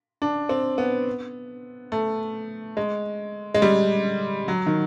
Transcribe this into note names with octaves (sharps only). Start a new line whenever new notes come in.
D4
C4
B3
A3
G#3
G#3
G3
F#3
D#3